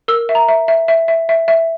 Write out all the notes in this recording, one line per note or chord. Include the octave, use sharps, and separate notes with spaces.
A#4 E6
E5
A#5
E5
E5
E5
E5
E5
E5